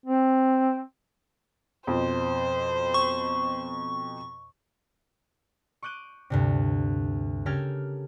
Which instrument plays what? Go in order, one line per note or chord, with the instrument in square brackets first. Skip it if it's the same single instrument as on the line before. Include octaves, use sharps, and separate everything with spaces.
[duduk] C4
[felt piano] F2 B2 F3 [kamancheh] C5
[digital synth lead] C#6
[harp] C#6 D6 F#6 G6 D#7
D2 G2 C3
C#3 G4 A4 A#4 F6 G#6